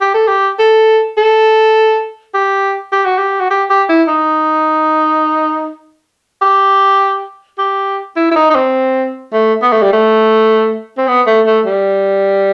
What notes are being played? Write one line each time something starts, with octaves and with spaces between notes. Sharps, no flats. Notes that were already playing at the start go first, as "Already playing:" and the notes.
G4
A4
G4
A4
A4
G4
G4
F#4
G4
F#4
G4
G4
E4
D#4
G4
G4
E4
E4
D#4
D#4
C4
A3
B3
A3
G3
A3
C4
B3
A3
A3
G3